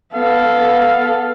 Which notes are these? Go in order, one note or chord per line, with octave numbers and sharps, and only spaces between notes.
B3 A4 F5